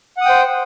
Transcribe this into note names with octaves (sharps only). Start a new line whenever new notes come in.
C5 F#5 G5 D#6